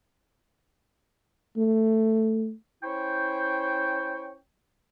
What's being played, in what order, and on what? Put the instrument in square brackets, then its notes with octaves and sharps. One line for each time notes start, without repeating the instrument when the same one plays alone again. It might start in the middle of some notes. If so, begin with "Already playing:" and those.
[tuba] A3
[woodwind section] C#4 E4 C5 G5 C#6